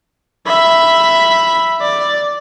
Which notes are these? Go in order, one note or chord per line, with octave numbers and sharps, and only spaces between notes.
E5 B5
D5